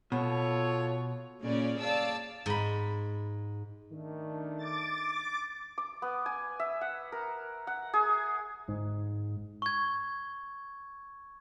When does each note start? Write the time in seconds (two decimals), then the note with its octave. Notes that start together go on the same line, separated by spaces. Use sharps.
0.12 B2 F4 A4 C#5
1.41 A#2 C#3 C#4 D5
1.79 G#4 D5 F5 A5 E6
2.46 G#2 B5
3.91 D#3 A3 D4
4.57 D6 A6
5.78 D6
6.02 B3
6.26 G#5
6.60 E5
6.81 F#5
7.12 A#4
7.67 F#5
7.94 G#4
8.68 G1 G#2
9.62 C#6 G#6